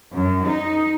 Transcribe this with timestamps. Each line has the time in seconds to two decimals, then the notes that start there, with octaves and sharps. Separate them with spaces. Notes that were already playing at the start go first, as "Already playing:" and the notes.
0.13 F#2
0.47 D#4